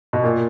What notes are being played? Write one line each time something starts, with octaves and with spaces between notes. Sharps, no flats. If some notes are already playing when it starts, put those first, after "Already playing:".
B2
A#2